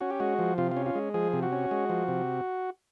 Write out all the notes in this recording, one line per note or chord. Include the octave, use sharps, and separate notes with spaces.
C#4 F#4
G4
G#3 F#4
F3
C3 F4
C#4 F4
F4
G#3
F3 G#4
C3
F#4
C#4
G#3
F3
C3